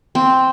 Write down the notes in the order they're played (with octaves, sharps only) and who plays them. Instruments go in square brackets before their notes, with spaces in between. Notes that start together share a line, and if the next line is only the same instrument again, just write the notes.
[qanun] C4